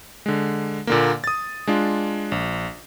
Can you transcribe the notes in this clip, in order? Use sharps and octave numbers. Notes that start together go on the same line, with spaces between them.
D3 G#3
A#2 D3 A#3
D#6 A6
G#3 D4 F4
A#1